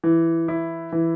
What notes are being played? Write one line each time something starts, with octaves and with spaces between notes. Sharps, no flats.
E3
E4
E3